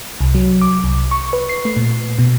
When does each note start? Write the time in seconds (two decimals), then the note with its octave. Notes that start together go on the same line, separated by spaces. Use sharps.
0.21 C2
0.35 F#3
0.62 D6
0.84 C2
1.11 C#6
1.33 B4
1.49 C7
1.65 A3
1.77 A#2
2.19 B2